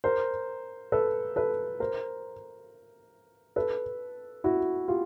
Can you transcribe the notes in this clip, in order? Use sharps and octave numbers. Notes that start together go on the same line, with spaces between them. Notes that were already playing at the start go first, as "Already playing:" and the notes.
A#4 C5
A4 B4
A4 B4
A#4 C5
A4 B4
E4 F#4
F4 G4